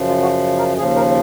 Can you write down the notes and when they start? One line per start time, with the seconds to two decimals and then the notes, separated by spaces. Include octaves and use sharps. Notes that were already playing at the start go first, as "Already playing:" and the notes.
Already playing: F#2 C#3 F3
0.09 F4
0.22 F#4
0.58 A#4
0.77 D#2 C#3 F3 G#4
0.96 A#4